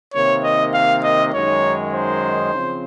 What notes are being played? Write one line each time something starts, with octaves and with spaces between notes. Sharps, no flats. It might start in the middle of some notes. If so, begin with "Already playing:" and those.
C3 D#3 A#3 C#5
D#5
F5
D#5
F#2 D#3 G#3 D#4 C#5
C5
C#3 F3 C4